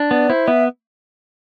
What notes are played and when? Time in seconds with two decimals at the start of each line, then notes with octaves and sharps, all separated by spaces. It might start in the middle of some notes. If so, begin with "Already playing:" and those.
Already playing: D4
0.10 B3 D5
0.30 E4 C5
0.48 B3 E5